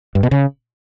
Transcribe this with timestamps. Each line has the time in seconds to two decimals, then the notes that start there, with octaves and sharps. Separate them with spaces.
0.15 G2
0.23 B2
0.31 C#3